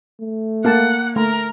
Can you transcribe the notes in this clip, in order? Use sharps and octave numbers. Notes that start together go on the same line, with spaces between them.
A3
A#3 F5 F#5 A5
A3 A#4